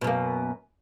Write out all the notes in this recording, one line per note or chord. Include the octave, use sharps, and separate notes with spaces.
F#2 B2 A#3